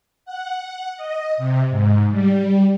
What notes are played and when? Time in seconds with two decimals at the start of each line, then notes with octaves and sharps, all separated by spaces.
0.25 F#5
0.97 D#5
1.37 C3
1.70 G#2
2.11 G3